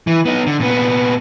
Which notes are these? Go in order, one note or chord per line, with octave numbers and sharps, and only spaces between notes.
E3
B3 D#4
D3
A#2 B3